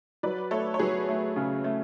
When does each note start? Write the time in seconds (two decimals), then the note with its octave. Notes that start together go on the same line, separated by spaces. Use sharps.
0.23 F#3 B4 D5
0.51 A3 A4 C#5
0.74 C#5
0.79 F#3 G#4 B4
1.08 A3
1.36 C#3
1.64 A3